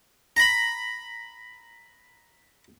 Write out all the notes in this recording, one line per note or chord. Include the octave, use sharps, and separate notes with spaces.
A#5 B5